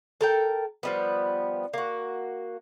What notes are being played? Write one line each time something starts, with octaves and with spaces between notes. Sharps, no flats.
A4 A#4 G5
F3 G3 B3
A#3 F#4